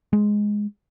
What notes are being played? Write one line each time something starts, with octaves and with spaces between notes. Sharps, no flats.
G#3